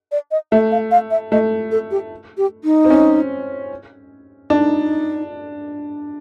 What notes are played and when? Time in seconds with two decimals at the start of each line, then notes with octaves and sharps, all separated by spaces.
0.12 D5
0.31 D#5
0.52 A3 E5
0.71 F5
0.91 F5
1.11 E5
1.32 A3 D#5
1.71 A4
1.91 G4
2.38 G4
2.64 D#4
2.85 C4
2.90 C#4
4.50 D4 D#4